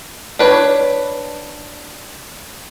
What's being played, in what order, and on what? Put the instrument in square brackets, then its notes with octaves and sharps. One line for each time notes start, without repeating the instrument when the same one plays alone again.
[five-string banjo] D4 B4 C#5